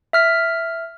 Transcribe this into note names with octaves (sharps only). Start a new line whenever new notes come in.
E5 F6 B6